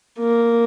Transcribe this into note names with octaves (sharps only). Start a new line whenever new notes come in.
A#3